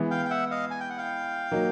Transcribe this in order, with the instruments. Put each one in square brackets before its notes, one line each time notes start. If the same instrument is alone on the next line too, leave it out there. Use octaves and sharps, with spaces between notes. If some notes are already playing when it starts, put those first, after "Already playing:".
Already playing: [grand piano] E3 G#3 B3 E4
[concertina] F5 G5
G5
E5 F#5
D#5 F5
G#5
G5
F#5
F5 G5
[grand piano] F#3 A#3 D#4